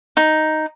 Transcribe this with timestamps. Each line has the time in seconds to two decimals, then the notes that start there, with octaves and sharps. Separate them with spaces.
0.17 D#4